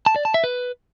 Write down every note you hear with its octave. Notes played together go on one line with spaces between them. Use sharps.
A5
D5
A5
E5
B4